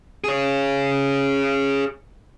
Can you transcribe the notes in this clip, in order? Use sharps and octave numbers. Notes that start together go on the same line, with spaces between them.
G#4 C#5